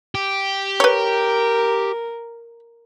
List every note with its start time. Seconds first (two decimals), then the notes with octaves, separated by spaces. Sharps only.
0.15 G4
0.80 A#4 B4 C#5